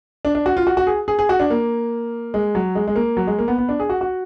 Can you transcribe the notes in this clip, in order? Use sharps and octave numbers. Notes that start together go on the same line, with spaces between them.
D4
D4
F#4
F4
F#4
F#4
G#4
G#4
G#4
F#4
D4
A#3
G#3
F#3
G#3
G#3
A#3
F#3
G#3
A#3
B3
B3
D4
G#4
F#4
F#4